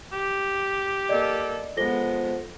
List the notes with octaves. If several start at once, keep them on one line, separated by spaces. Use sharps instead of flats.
G4
A#3 A4 D5 D#5
F3 G#3 B3 A4 A#6 G7